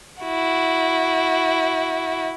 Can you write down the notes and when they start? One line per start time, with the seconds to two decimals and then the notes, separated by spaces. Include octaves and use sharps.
0.22 E4 F#4